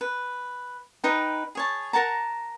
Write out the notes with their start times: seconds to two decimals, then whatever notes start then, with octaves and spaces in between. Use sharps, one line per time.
0.01 B4
1.04 D#4 A#4 B4 G5
1.55 G#4 C#5 A5
1.93 A#4 F#5 A5 A#5